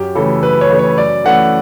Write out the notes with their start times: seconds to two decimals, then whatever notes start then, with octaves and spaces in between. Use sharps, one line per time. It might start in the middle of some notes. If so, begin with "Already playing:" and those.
Already playing: F#2 G4
0.15 C#3 E3 A3 A4
0.42 F#2 B4
0.61 C#5
0.70 C#3 E3 A3
0.79 C#5
0.98 F#2 D5
1.24 E3 A3 C#4 F#5